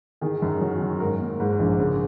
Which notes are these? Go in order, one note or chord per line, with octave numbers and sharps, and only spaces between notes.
D#3 G#4
F#2
F#3
D#3
G#2 A#4
A#3
G#2
A#1
C#3